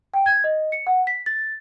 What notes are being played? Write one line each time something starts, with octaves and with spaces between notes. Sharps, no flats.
G5
G#6
D#5
C#7
F#5
B6
A6